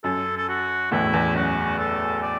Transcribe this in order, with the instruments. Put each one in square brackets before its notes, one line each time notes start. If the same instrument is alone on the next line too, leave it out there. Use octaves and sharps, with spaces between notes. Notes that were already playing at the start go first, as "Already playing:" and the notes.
[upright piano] F#2 [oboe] A4
[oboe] A4
F#4
[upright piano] E2 A2 [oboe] E4
[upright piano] E2
[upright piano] F#2 [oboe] F#4
[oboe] A4
D5